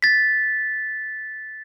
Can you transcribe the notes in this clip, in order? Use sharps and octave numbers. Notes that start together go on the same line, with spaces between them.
A6 B6